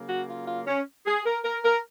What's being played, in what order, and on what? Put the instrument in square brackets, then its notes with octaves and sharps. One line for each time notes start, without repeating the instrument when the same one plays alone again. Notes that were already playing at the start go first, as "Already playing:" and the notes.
Already playing: [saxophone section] C#3 F#3 A#3
F#4
F4
F4
C#4
G#4
A#4
A#4
A#4